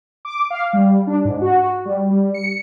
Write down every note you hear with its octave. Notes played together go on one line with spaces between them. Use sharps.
D6
F5
G3
D4
G#2
F#4
G3
G3
C#7